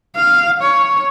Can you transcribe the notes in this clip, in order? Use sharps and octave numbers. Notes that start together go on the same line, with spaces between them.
F5
C#5